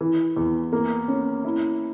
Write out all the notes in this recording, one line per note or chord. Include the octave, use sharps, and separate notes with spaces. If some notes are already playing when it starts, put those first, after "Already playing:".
E3
E2
A#3
C#4
E4